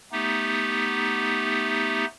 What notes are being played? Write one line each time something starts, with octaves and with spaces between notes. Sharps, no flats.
A3 B3 D#4 G4